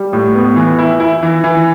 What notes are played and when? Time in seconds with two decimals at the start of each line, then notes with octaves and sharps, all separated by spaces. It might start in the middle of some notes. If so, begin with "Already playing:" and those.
Already playing: G3
0.13 A2
0.35 B3
0.56 E3
0.79 E4
1.00 E4
1.23 E3
1.44 E3